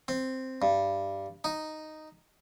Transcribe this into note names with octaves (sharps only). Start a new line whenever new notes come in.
C4
G2
D#4